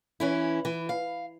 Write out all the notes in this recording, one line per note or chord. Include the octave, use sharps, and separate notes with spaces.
E3 C#4 E4
E3
F5